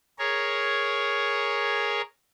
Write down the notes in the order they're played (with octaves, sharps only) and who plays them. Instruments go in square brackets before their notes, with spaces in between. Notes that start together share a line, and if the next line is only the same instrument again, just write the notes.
[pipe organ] G#4 A#4 C#5